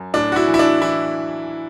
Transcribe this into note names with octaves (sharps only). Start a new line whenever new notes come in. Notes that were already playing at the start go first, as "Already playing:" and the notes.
Already playing: F#2
A2 D4
F#4
E4
E3
E4
D4
E3 E4